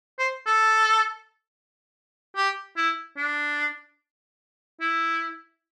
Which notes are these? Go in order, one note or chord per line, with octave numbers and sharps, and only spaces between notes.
C5
A4
G4
E4
D4
E4